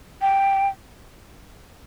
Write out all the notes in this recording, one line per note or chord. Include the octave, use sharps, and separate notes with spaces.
G5